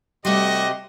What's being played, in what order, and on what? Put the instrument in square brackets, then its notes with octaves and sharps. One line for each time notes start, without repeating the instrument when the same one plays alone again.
[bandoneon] C3 G4 C6 [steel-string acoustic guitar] G3 A3 [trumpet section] F#4 D5 D#5